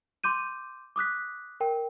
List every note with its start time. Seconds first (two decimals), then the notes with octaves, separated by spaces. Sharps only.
0.24 C6 D6 G6 D#7
0.96 D6 D#6 F#6 B6
1.60 A#4 G5